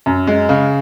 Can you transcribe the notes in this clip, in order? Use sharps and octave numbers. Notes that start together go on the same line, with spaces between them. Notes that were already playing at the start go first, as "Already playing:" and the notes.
F#2
G#3
C#3